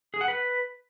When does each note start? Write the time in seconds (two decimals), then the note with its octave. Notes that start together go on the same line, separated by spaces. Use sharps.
0.14 G#4
0.21 F#5
0.28 B4